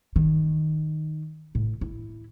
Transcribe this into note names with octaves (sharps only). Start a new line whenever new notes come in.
D#3
A2
E4